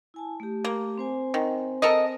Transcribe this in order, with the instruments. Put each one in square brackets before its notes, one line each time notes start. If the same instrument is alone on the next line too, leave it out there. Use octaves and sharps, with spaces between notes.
[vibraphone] E4 G#5 A5
A3 G4
[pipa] A#3
[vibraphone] C4 C5 G#5
[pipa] D#3
A4 A#4 D#5